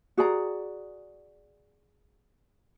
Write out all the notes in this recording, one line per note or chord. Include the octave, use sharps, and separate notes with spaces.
F#4 G#4 D5 A#5